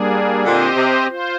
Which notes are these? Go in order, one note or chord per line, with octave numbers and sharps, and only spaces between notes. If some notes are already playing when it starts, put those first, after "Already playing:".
Already playing: G3 A#3 D4 G#4
A#2 D3 C4 G4 C5 D#5
C3
F4 C5